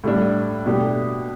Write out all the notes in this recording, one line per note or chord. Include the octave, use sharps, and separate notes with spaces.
A2 G3 D4
B2 A3 D4 G4